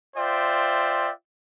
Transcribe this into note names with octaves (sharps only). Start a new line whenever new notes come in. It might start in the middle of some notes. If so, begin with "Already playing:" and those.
F4 C5 D5 E5 G5